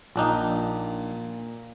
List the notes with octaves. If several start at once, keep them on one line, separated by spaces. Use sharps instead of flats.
A#1 A#2 D4 D#4